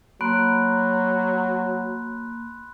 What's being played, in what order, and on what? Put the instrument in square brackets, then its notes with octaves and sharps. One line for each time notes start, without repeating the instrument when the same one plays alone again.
[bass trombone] F#3 [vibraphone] A#3 [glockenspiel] B5 C6 F#6